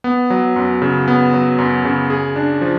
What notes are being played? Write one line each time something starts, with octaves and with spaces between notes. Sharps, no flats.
B3
F#3
F#2
C#3
B3
F#3
F#2
C#3
G#4
D4
F3